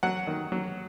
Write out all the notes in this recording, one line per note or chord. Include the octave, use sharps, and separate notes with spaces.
F#3 F#5
D#3
F#3